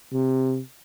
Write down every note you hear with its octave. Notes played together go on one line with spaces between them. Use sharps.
C3